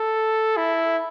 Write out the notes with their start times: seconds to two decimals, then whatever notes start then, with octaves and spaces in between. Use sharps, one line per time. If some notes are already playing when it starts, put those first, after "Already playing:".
Already playing: A4
0.57 E4